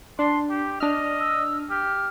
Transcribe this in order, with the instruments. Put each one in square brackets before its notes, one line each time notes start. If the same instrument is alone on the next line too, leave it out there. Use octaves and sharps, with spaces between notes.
[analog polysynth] D4 [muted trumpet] C6
[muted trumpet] G4
[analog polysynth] D4 F6 [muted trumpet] D#5
[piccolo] E6
[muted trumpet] G4 [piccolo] F6